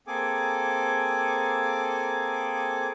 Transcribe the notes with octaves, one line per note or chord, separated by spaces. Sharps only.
A#3 C4 G#4 A4 G#5 D6